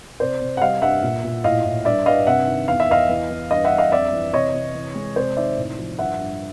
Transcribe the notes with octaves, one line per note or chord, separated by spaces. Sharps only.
C3 C5 D5
C3
F#5
G3 D#5 F5
G2 E5 F#5
A#2
A#2
A2 D#5 F5
A2
G2 D5 E5
G2 D#5 F5
C3 E5 F#5
D#3
E2 F5
E5
E2 D#5 F5
E3
E3
G2 D#5 F5
E5 F#5
G2
D#5 F5
F2 D5 E5
E3
C3 C#5 D#5
C3
E3
G#3
C3 C5 D5
D#3 D5 E5
A2
F3
G2 E5 F#5
G2